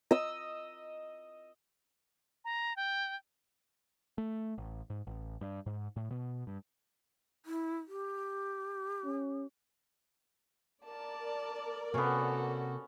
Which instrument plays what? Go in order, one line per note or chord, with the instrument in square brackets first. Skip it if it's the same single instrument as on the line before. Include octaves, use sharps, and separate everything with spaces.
[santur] D#5 E6
[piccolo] A#5
G5
[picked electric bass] A3
A1
G#2
A1
G2
G#2
A2
B2
G2
[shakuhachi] E4
G4
[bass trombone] C#4
[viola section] A#4 D5 [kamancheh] A5
[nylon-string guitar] C3 A#3 [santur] B3 C#4 [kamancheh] F#4 A4